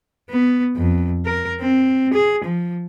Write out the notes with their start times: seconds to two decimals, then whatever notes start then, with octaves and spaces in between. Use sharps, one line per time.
0.30 B3
0.76 F2
1.26 A#4
1.61 C4
2.13 G#4
2.44 F3